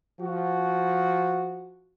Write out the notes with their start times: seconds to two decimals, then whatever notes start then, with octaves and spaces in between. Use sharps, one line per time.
0.20 F3 F#4